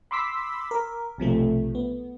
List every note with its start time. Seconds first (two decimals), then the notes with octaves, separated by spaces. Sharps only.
0.11 B5 C6 D6 E6 B6
0.71 A#4
1.18 B1 C3 F3 A3
1.75 B3